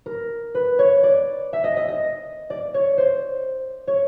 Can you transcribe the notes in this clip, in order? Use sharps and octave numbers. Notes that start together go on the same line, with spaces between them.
A#4
B4
C#5
D5
E5
D#5
D#5
D#5
D5
C#5
C5
C#5